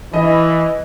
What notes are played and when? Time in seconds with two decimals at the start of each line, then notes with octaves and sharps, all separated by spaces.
0.14 E3 D#5